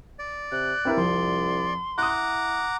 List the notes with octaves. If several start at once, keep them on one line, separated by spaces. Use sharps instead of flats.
D5
C3 F#6
G2 C4 E4 A#4
C2 F2 C6
E4 F#5 A#5 D6 D#6 F#6